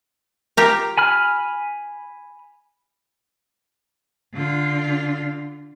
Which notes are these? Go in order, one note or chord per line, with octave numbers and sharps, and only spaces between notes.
F4 G4 A#4
G#5 B5 F6
D3 F4